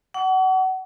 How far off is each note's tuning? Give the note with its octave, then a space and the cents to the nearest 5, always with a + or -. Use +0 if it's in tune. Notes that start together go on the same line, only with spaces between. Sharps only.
F#5 +25 C#6 +45